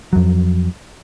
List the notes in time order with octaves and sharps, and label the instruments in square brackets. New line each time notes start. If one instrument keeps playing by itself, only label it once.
[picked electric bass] F2 F#3